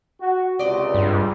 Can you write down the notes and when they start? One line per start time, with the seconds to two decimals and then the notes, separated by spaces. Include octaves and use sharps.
0.21 F#4
0.59 C#2 C3 D5 D#5
0.94 G2